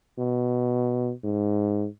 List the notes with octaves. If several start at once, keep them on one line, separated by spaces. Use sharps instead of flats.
B2
G#2